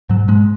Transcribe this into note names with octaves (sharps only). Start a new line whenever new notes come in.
G#2 F#3
G#2 G#3